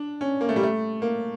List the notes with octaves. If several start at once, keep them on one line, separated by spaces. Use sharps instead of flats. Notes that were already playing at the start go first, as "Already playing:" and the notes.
Already playing: D4
C#4
A#3
A3
G3
A3
A#3